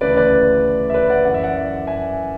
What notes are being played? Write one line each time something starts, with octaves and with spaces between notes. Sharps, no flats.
D2 C#3 E3 B4 D5
B4 D5
E5
B4 D5
D5 F#5
F#2 E3 F#5
E5
D5 F#5
E5 G#5